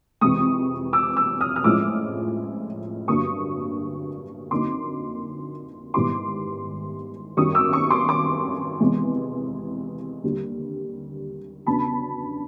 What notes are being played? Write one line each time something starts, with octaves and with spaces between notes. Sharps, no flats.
F2 C3 E3 G#3 C#6 D#6
D6 E6
D6 E6
D#6 F6
F6
A2 F3 G#3 C#4 E4 D6 E6
G2 D3 F#3 A#3 D4 C#6 D#6
F2 D3 F#3 A#3 D#4 C6 D6
G#2 D#3 G3 B3 E4 C6 D6
F#2 D#3 G3 C#6 D#6
D6 E6
C#6 D#6
C6 D6
C6 D6
E2 C3 E3 G#3 B3
D#2 D3 G3
E2 C#3 F#3 B3 D4 A5 B5